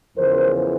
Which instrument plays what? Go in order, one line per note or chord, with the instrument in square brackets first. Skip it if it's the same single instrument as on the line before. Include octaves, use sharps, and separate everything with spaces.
[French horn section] E2 C#3 F3 A#4 C5